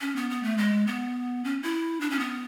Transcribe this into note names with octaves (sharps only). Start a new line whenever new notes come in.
C#4
B3
B3
A3
G#3
B3
C#4
E4
D4
C#4
B3